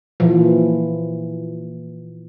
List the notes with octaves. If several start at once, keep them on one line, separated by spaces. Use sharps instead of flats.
A#2 E3 F3